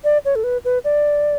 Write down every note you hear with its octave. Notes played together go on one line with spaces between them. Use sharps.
D5
C#5
A4
B4
B4
D5